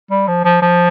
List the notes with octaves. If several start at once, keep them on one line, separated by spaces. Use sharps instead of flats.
G3
F3
F3
F3